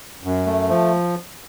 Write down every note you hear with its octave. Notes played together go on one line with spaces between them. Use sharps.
F#2
A3
F3